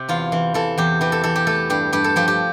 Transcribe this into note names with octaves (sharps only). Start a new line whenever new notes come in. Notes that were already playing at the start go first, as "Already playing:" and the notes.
Already playing: C3 G4
E2 F4
E3
E3 A4
E2 G4
E3 G4
A4
E3 A4
G4
A3 A4
G2 G4
G2 G4
A4
F3 G4
G4